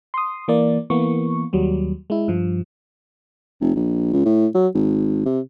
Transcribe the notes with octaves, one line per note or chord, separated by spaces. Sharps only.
C6 D#6
E3 A#3 D5
E3 A#3 B3 C#6
D#2 F#3 G3
G#3 E4
G2 F3
F1
A#1
C#2
A2
F#3
G#1
C3